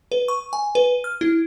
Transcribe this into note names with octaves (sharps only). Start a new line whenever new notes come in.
B4
C#6
G#5
B4
F6
E4